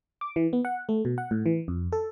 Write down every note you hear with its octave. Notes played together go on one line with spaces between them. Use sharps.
D6
E3
B3
F#5
A3
B2
F#5
A2
E3
F2
A4